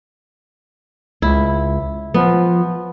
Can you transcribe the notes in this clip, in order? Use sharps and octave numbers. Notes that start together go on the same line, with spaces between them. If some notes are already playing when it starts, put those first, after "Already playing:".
C#2 E4
F3 B3